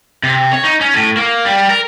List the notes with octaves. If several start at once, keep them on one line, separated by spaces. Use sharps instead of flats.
C3
C#5
D#4
C#4
A2
A#3
G3
A#4